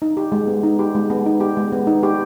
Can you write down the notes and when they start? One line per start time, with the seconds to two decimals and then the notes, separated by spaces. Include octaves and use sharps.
0.02 D#4
0.17 G4
0.32 G#3
0.47 B3
0.63 D#4
0.79 G4
0.95 G#3
1.10 B3
1.26 D#4
1.40 G4
1.57 G#3
1.72 B3
1.87 D#4
2.03 G4